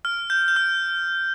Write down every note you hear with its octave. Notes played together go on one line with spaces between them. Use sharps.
F6
G6
G6
F6